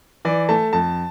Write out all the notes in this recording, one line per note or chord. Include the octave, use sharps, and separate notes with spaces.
E3 D5
A3 A5
F2 A5